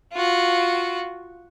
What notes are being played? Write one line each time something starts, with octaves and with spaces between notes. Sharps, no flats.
F4 F#4